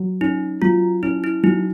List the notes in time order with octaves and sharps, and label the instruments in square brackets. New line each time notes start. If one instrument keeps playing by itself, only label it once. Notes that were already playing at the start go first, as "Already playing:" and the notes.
Already playing: [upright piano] F#3
[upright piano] C#4 [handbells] D#4
[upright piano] F#3 [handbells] F4
[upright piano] C#4 [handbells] E4
[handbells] E4
[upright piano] F#3 [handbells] D#4